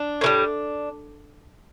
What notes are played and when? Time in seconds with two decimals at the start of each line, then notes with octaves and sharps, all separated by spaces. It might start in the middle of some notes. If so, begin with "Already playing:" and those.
Already playing: D4
0.21 A2 E3 G3